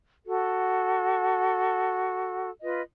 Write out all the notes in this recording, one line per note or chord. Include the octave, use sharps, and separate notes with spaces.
F#4 A4
F4 B4 D#5